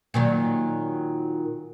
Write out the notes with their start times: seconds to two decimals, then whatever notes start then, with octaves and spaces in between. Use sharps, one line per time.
0.14 A#2 D#3 F#3